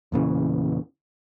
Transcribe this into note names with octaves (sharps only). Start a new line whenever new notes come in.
E2 A#2 C#3 E3